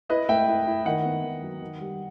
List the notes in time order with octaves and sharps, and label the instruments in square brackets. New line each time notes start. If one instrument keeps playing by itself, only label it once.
[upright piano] E4 B4 D#5
A3 E5 G5
E4
E4
D#3 D#5 F#5
B3
D#3
F#3
D#3
G3